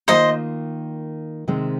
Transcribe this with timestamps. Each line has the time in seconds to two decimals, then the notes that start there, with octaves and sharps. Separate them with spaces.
0.08 D#3 A#3 F4 C5 D#5
1.48 C3 D#3 G#3 C4